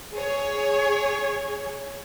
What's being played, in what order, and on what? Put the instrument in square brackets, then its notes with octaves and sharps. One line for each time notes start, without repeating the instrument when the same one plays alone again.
[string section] G#4 C#5